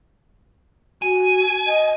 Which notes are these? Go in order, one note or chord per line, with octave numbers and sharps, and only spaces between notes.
F#4 G#5
D#5